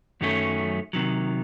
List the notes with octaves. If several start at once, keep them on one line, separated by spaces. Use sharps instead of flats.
F#2 D#3 F#3 A3 C#4
C3 D#3 F#3